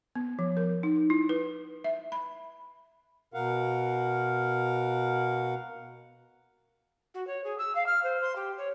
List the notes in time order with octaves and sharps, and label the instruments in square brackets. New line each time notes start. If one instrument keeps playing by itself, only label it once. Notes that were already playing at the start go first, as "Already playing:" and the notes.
[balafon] B3
F3
A#4
D#4
E4
B4
E5
B5
[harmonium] B2 A#4 F5 F#5
[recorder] F#4
C#5
G#4
E6
F5
F6
C5
C6
G4
C#5